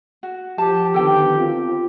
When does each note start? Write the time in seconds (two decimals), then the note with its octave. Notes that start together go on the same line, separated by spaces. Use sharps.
0.23 F#4
0.58 F3 G4 A5
0.94 D3 D#3 B3 A4 G5
1.37 C4 F4